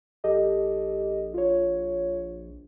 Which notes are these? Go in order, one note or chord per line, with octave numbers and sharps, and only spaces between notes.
A#1 G4 A4 D#5
F4 C#5